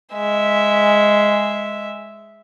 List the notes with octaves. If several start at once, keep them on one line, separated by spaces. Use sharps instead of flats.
G#3 E5